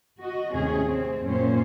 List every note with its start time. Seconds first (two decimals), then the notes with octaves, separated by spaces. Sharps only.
0.20 F#4 D#5
0.54 D#2 A2 C3 C#4 G#4
0.87 C4
1.25 F#2 A#2 C#4 C5